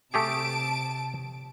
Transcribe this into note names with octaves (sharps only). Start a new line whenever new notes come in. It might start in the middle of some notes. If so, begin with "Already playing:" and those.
C3 A3 G4 G#4 A5 D7